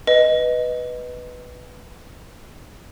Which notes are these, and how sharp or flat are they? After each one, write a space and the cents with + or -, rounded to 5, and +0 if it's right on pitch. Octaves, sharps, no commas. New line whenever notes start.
B4 +0 D#5 +0